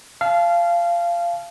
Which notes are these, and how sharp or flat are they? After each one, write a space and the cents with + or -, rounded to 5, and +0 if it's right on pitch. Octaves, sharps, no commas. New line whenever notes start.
F5 -20 A5 -30